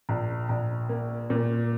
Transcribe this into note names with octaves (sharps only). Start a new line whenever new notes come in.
A#1
A#1
A#3
A#2